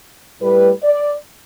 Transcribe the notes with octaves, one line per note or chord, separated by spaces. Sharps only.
A2 G3 B4
D5